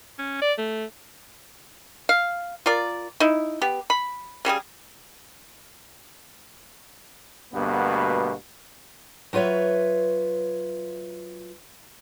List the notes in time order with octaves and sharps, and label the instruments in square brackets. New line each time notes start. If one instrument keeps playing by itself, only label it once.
[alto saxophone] C#4
D5
A3
[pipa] F5
F4 A#4 D5
D#4 E4
B3 G4
B5
C#3 G3 F#4 G#4
[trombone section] D2 G2 B2 A#3 B3
[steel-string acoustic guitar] F#3 F4 B4 C#5 E5